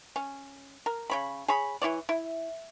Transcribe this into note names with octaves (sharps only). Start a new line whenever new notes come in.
C#4
A#4
C#3 C#5 B5
G#4 C#5 B5
E3 E4 C#5 D5
E4